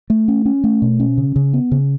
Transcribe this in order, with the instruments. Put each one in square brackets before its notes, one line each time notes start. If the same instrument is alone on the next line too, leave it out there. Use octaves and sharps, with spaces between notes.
[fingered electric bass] A3
C#4
C#4
A3
B2
C#4
C#3
C#3
B3
C#3